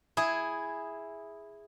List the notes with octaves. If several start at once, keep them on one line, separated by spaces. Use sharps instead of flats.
E4 G#4